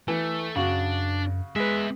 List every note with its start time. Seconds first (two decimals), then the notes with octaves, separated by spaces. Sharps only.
0.08 E3 A3
0.56 F#2 C#3 D4 F#4
1.56 G#3 B3 B4 E5